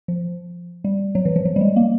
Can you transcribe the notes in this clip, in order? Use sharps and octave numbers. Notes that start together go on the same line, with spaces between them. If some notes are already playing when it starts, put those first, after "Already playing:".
F3
G3
F#3
E3
F3
F#3
G3
G#3
A#3